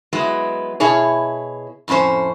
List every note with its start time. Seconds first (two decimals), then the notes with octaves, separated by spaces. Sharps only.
0.13 F#3 G#3 B3 E4
0.80 B2 E4 G#4 C#5
1.88 F2 A2 D3 C#4 C5